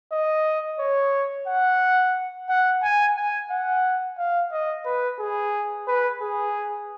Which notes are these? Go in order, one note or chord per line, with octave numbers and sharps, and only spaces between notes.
D#5
C#5
F#5
F#5
G#5
G#5
F#5
F5
D#5
B4
G#4
B4
G#4